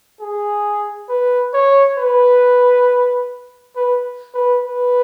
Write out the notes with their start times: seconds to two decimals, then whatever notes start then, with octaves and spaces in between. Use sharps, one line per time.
0.21 G#4
1.09 B4
1.54 C#5
1.98 B4
3.76 B4
4.34 B4
4.64 B4